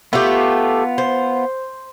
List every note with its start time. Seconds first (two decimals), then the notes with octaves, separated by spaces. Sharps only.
0.13 A3 B3 F4 G4
0.98 C5